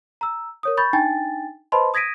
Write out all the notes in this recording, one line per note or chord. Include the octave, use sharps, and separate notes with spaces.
A#5 E6
A#4 C#5 D#6
B5 C#6 G6 A6
D4 D#4 G5 G#5 A6
B4 C5 D#5 A5 B5 C6
D#6 G#6 A#6 B6 D7 D#7